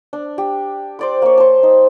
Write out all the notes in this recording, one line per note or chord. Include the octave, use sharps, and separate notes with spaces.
D4
G4
C5 D5 D6
A#3 C#5
C5 A5
D#4